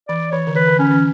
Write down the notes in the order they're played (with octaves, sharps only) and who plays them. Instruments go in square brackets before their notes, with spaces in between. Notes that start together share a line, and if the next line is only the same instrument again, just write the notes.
[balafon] E3 [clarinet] D5
[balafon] E3 [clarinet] C#5
[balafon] D3
[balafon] E3 [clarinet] B4
[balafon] D3
[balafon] D3 [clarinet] C#4
[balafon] E3